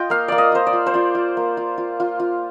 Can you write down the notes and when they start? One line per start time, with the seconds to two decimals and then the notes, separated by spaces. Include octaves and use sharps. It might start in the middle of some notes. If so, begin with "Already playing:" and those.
Already playing: F4 D#5 G5
0.10 A#3 F5
0.28 A#3 D5
0.38 D#5
0.52 F4 C5
0.67 D5
0.73 F4
0.87 C5
0.94 F4 D5
1.15 F4
1.37 A#3
1.57 F4
1.78 F4
2.00 F4
2.20 F4